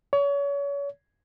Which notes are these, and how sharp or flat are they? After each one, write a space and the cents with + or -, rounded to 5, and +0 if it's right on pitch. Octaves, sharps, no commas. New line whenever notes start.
C#5 +35